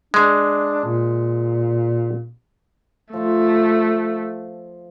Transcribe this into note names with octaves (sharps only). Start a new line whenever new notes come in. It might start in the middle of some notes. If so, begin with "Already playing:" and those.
G#3 D4
A#2
F3 A3